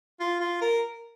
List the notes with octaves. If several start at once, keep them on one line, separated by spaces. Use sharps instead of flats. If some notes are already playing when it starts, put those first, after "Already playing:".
F4
F4
A#4